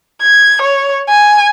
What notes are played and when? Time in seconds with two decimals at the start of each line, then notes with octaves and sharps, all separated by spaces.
0.22 G#6
0.62 C#5
1.09 G#5